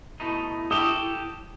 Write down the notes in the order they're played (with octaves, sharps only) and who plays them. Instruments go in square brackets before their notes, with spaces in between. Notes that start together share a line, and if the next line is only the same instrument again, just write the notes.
[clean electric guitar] B2 A3 D#4 [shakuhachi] E4
[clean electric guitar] F#4 G4 A4 [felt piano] D#6